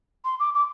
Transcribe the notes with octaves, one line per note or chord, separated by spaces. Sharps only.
C6
D6
D6